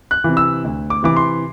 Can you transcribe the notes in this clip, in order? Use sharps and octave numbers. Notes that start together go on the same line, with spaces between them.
F#6
C3 E3
E6
D2
D6
C3 E3 D6
C6